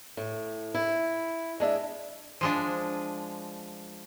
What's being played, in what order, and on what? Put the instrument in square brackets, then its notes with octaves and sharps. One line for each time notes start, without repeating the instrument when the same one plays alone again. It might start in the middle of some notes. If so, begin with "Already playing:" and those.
[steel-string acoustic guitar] A2
E4
G#3 D4 E5
[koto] F3 G#3 D4